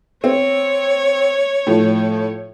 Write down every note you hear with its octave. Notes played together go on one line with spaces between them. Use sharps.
C4 C#5
A2 F3